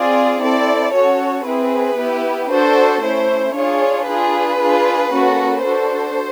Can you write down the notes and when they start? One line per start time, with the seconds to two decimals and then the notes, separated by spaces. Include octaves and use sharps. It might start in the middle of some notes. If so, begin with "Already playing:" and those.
Already playing: C4 F4 G#4 D5
0.41 C4 E4 A4 D5
0.93 C#4 F#4 A4 C#5
1.46 C4 E4 G#4 B4
1.98 B3 E4 G4
2.51 D4 F#4 A4 C5
3.03 A3 C#4 E4 C5
3.55 D4 F4 G#4 C#5
4.08 D4 F4 G#4 B4
4.60 D4 F4 G#4
5.13 A#3 C#4 F#4 A4
5.65 D4 F#4 A4 C5